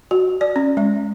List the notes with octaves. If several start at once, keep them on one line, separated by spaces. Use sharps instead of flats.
F#4
D5
C#4
G#3